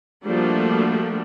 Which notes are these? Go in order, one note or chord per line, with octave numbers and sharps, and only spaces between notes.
F3 G3 A3 A#3 D4 F#4